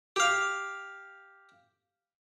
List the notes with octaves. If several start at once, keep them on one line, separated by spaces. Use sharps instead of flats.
G4 F5